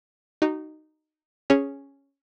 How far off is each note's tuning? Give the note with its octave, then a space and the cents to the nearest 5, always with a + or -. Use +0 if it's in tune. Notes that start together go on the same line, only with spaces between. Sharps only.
D#4 -10 F#4 +35
C#4 +0 G#4 +0 C#5 +0